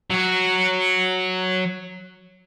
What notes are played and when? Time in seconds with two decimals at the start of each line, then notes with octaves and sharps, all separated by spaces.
0.10 F#3 F#4